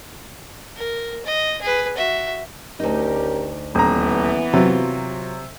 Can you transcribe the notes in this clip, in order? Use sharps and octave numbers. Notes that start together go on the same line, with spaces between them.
A#4
D#5
G#4 B4
F#4 E5
D2 C#4 D#4 G4 A#4
D#1 E3 B3 A#5
C3 F#3 F4